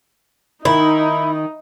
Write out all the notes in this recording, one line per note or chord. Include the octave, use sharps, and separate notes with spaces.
D#3 D#4 E4